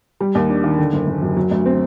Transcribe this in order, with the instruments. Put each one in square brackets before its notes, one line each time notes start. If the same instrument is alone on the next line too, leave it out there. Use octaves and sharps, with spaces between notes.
[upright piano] G3
D#2
D4
D#3
D3
F#1
F#1
F#2
F#3
D2
C4